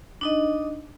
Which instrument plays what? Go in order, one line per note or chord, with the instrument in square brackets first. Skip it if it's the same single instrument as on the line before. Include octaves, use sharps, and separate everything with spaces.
[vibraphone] D4 D#4 D#5